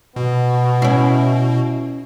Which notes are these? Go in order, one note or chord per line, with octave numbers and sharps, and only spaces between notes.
B2 B3
C#4 E4